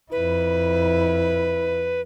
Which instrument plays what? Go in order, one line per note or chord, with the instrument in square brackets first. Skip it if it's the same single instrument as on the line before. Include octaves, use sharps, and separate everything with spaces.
[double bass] F2 E4 [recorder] B4